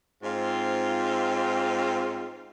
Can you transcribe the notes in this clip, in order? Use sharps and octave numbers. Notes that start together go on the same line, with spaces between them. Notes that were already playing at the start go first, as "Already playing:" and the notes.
G#2 C4 F4